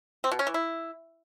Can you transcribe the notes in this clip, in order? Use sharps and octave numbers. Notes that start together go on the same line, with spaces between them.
C4
B2
C#4
E3
E4